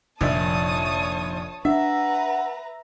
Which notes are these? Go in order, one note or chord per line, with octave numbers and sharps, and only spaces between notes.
F1 A#1 D#3 C#5 E5 A5 D#6
D4 B4 E5 F#5 A#5